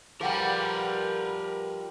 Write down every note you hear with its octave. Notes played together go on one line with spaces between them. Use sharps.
F3 G3 G#4 A#4 B4 F#5 G5